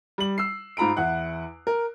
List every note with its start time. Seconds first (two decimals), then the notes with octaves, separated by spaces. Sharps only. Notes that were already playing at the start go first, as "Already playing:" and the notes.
0.18 G3 F#7
0.38 E6 C7
0.77 G#2 F4 A#5 B5 D7
0.97 E2 E4 F#5 F#6
1.67 A#4